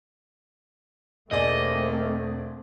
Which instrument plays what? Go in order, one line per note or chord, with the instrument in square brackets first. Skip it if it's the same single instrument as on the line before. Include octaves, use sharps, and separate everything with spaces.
[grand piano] E1 G#4 D5 [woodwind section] D#3 A#3 [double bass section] A3 C4 [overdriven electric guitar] D#5